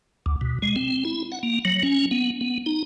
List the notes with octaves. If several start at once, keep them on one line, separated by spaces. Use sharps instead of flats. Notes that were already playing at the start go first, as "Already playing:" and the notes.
D2
B2
G#3
C4
E4
F#5
A#3
F#3
C#4
B3
B3
D#4